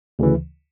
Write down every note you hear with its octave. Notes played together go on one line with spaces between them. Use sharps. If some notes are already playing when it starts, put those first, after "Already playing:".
D2 C#3 E3